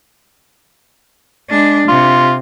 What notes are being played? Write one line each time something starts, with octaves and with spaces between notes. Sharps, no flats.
G#3 D4
C3 F4